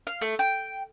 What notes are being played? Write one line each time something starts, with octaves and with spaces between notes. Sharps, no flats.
F5
A3
G5